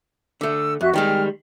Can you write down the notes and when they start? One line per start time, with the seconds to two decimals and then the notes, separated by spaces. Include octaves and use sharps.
0.41 D3 A3 E6
0.81 F2 F#4 E5 F#6
0.94 D#3 G3 G#3 G5 F6